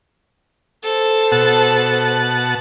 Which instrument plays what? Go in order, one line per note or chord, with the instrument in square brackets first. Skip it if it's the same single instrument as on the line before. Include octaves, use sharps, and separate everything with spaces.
[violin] A4 C5
[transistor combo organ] B2 F#5 A5